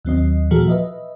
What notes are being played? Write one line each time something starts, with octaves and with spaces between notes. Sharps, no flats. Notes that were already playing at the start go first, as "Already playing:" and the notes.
D#2 F#3 C4 D#5
A#2 E3 F3 F#4 G#4 A4
B4 D#5 E5